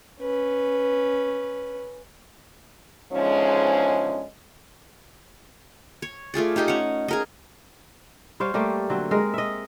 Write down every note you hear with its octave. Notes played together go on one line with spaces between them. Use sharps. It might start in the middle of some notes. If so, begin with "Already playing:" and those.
C#4 B4
E2 G#2 D3 F3 G#3 C#4
C#5
A3 F4 G#4 D5
D#4 G4 C5 D#5
C#4 F#5
G#4 A#4 D#5
G3 C5 C#5 F5
G3 A3 A#3 G4
D3 F#3 C4
G#3 A#4
D#5 E5